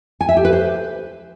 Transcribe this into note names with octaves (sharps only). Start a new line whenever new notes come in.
G#5
E5
G4
B4
C5